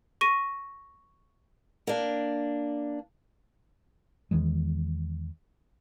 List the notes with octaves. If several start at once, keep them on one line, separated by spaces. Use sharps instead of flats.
C#6 A#6 D#7
A#3 D4
E2 D#3 E3 G#3